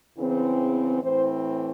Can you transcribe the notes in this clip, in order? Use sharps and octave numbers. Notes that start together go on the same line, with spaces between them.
E2 C#3 E3 C4
A2 E3 C4 C5